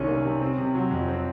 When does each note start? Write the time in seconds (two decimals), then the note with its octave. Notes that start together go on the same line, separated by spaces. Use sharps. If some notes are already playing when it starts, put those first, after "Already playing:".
Already playing: C2 C3 D#3 C#4
0.08 A#3
0.25 C3
0.41 C4
0.58 C3
0.75 F#3
0.91 F2
1.08 C4